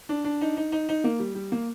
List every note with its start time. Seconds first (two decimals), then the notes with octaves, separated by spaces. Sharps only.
0.09 D4
0.25 D4
0.41 D#4
0.57 D#4
0.72 D#4
0.89 D#4
1.04 A#3
1.19 G3
1.35 G3
1.52 A#3